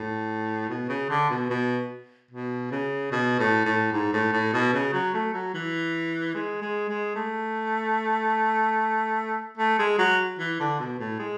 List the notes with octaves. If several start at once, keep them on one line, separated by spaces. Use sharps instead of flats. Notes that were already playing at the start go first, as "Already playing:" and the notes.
Already playing: A2
B2
C#3
D3
B2
B2
B2
C#3
B2
A2
A2
G#2
A2
A2
B2
C#3
F#3
A3
F#3
E3
G#3
G#3
G#3
A3
A3
G#3
F#3
E3
D3
B2
A2
G#3